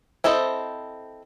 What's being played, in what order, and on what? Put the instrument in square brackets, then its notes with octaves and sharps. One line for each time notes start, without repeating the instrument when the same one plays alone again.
[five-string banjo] C4 E4 A4 C5 D#5